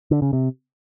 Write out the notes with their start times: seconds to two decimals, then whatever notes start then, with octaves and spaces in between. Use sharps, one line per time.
0.11 D3
0.22 C#3
0.33 C3